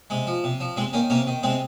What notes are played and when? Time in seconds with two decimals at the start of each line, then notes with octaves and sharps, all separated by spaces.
0.10 C3 G#3
0.27 F3
0.44 C3
0.60 F3
0.76 C3 G#3 C4
0.93 D#3 A#3 C#4
1.10 C3 A#3 C#4
1.27 D#3
1.43 C3 G#3 C4